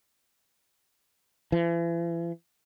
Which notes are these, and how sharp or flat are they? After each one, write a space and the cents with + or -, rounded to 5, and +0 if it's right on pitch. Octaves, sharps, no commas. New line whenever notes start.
E3 +40